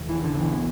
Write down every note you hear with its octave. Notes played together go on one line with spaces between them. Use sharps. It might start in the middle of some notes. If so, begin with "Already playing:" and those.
Already playing: F1 E2
E3
D3
D3
B1 B2 E3